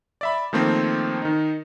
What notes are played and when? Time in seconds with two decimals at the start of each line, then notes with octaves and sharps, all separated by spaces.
0.21 D5 E5 B5
0.53 D#3 F3 A3 A#3 C4
1.22 D#3 D#4